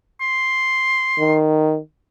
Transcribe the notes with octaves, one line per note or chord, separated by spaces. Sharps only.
C6
D#3